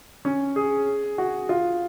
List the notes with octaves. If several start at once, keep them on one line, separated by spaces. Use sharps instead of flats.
C#4
G#4
F#4
F4